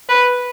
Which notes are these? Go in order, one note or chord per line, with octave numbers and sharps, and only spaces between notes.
B4